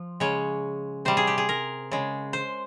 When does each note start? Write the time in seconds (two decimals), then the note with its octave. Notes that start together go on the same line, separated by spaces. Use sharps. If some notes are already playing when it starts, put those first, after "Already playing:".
Already playing: F3
0.20 C#3 G#3 C#5
1.05 C3 G3 C5
1.17 G#4
1.27 G4
1.38 G#4
1.49 A#4
1.91 C#3 G#3
2.33 C5